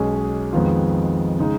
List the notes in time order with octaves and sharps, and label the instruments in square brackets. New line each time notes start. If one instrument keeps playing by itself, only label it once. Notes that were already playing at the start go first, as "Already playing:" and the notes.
Already playing: [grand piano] B1 B2 G#3 C#4 G#4
F2 D#3 G#3 B3 F4
C#3 G#3 D#4